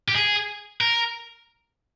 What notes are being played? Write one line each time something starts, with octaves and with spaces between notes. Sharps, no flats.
G4
G#4
A#4